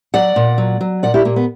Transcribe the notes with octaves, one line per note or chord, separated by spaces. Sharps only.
F#3 D5 F#5
A#2
F#3
F#3
A#2 D5 F#5
E4 G4
A#2 A#3
B3